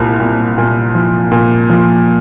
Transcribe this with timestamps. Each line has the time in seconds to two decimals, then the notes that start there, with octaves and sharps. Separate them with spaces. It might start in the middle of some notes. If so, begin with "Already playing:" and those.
Already playing: C2 A#2
0.20 A#2
0.58 A#2
0.95 F3
1.32 A#2
1.70 F3